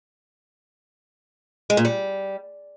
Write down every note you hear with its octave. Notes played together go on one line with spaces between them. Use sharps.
G#3
A#2
G3